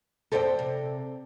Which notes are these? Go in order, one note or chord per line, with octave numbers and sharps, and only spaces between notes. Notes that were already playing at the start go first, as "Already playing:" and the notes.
F2 G4 A4 C5 D5 G5
C3